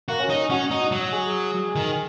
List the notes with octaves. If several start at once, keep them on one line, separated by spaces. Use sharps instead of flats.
A#3 F#4
C#4
D#4
C#4 F#4
D#4
F#4
F#3
G#4
D#3